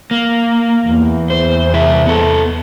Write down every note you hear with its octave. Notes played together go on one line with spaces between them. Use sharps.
A#3
E2
C5
C3 E4 E5
B3 A4